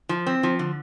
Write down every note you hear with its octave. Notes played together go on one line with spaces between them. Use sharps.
F3
C4
F3
D3